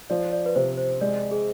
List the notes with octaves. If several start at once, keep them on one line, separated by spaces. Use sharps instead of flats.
F3 D5
D5
B4
C3 C5
C5
G#3 D5
G#4